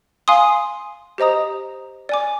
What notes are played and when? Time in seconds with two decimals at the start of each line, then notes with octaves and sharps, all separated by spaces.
0.28 F5 G#5 C6 D#6
1.18 G4 C5 D#5 A#5 D#6
2.09 D5 G#5 D6